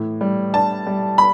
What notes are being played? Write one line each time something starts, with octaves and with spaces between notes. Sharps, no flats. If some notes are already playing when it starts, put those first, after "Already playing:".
Already playing: A2 E3
G3
D4 A5
G3
B5